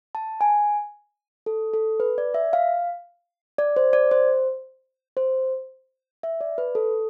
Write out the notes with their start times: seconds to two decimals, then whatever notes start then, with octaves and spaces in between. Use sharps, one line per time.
0.15 A5
0.41 G#5
1.46 A4
1.74 A4
2.00 B4
2.18 D5
2.34 E5
2.53 F5
3.58 D5
3.76 C5
3.93 D5
4.11 C5
5.17 C5
6.23 E5
6.41 D5
6.58 B4
6.75 A4